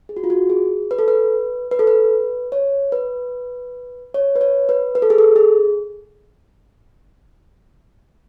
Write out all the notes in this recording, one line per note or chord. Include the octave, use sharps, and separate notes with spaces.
G#4
F#4
F4
F#4
G#4
B4
A4
B4
B4
A4
B4
C#5
B4
C#5
B4
C#5
B4
B4
A4
G#4
A4
G#4